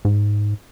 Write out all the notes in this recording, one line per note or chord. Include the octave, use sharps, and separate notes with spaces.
G#2